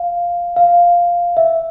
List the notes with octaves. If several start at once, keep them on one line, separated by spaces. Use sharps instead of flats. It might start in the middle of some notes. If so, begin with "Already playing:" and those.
Already playing: F5
F5
E5